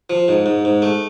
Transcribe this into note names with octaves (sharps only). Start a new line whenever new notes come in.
F3
G#2
G#2
G#2
A3